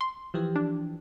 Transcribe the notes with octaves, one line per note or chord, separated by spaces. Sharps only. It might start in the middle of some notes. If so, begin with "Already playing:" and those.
C6
E3 F3 G4
D4